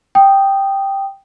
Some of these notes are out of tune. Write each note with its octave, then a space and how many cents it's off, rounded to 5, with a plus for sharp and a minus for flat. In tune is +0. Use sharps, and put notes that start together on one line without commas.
G5 +0 D#6 -5